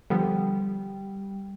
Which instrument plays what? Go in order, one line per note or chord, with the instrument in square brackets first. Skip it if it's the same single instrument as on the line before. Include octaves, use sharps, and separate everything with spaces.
[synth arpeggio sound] D3 F3 B3 [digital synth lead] G3